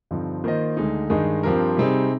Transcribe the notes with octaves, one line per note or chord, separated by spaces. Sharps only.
G2 D3 F3 C4 D#4
D#3 A#3 F4 C5 D#5
D2 D3 G#3 D#4
G2 D#3 G#3 D#4 G#4
G2 F3 C4 G4 A#4
C3 G3 C4 D#4 G#4